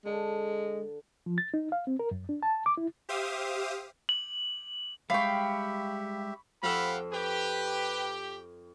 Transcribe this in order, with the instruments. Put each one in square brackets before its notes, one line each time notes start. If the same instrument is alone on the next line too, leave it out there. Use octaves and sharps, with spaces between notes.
[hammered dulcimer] D3 [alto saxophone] G#3
[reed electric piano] F3
A6
D#4
F5
C4
A#4
F#2
D4
A5
D6
E4
[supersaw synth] G4 C5 E5 F5 D#6
[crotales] F#7
[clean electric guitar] G3 G#3 [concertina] G4 E5 [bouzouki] F5 G5 [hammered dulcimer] B5 C#6
[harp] F2 A4 E6 [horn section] G4 F5 F#5 [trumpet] B5
[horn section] G4 [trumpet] B4